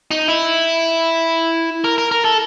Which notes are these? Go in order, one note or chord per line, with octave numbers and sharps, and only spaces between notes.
D#4
E4
A#4
A#4
A#4
A4